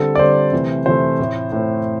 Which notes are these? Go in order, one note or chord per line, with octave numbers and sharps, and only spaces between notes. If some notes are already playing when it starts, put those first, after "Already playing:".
Already playing: D3 G3 C4 A4
D5
D3 G3 C4 C5
C3 E3 A3
C3 E3 A3 C5
A2 A3 C4
A2 A3 C4